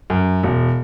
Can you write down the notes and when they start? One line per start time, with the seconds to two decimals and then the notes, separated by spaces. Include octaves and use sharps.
0.10 F#2
0.43 E1